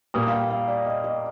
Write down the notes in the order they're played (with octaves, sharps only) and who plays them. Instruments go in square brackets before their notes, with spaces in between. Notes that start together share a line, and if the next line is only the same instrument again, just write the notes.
[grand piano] A#2 G3 A#3 [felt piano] D#6
[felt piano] F5
G5
F5
D5
D#5
D#5